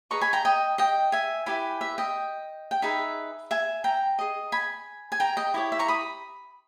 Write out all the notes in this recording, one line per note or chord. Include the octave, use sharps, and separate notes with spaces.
G#4 B4 D#5 A#5 C#6
G#5 B5
G5 A#5
D#5 G5
D#5 G5
E5 G#5
E4 G4 B4 E5 G#5
E5
D#5 G5
G5
D#4 G#4 B4 E5
E5 G#5
G5 A#5
G#4 D#5
G#5 B5
G#5
G5 A#5
D#5 G5
E4 G4 C#5 D#5
E5
A#5 C#6
B5 D#6